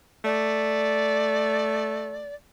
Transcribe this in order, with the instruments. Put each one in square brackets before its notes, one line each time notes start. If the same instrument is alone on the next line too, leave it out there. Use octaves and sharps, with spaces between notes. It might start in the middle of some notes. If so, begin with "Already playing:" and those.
[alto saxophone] A3 [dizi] D5